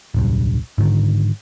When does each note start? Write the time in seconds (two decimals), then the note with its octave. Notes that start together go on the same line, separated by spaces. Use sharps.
0.14 D1 B1 G2
0.78 G#2 D3 D#3